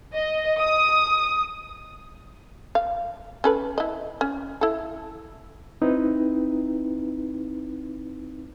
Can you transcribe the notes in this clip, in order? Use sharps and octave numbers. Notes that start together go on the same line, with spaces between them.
D#5
D#6
F5
C#4 A4 B4
E4 D#5
C#4
E4 A4
C4 D#4 E4 B4